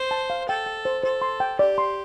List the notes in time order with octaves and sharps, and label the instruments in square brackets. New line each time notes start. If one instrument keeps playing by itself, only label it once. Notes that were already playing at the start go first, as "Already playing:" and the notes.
Already playing: [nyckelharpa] C5
[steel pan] A5
F5
[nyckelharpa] A4 [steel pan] G5
[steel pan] G5
C5
[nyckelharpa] A4 [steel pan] C5
[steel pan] C6
G5
[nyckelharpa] G4 [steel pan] D5
[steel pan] C6